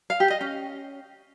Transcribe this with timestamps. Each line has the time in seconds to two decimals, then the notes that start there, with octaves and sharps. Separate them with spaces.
0.10 F5
0.20 G4
0.30 D#5
0.41 C#4